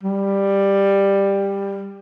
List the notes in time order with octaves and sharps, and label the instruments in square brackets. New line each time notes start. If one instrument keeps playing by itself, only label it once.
[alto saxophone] G3